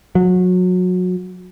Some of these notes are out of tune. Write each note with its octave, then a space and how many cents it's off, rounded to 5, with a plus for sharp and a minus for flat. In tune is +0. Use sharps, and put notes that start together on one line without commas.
F#3 -25